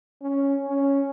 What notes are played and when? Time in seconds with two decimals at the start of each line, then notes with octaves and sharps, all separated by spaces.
0.22 C#4
0.68 C#4